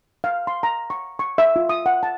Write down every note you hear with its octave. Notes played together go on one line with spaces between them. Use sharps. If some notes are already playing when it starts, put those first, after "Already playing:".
F5
C6
A#5
C#6
C#6
E5
F4
D#6
F#5
A5